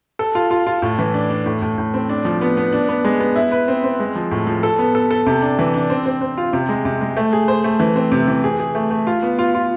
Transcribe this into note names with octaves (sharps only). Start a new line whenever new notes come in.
A4
F4
F4
F4
A2
E3
D4
D4
A2
A2
A2
C4
D4
F3
B3
B3
D4
B3
G#3
B3
E4
B4
C4
C4
G#3
F3
A2
F3
A4
B3
A4
A4
C3
D4
E3
D4
C4
C4
C4
F4
C3
G#3
C3
G#3
A3
G#4
C5
A3
E3
C4
C3
E3
G#4
G#4
A3
A3
F4
B3
F4
F4